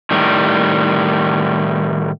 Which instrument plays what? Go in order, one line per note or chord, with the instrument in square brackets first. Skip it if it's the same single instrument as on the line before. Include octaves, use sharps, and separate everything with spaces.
[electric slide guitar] A2 D#3 G3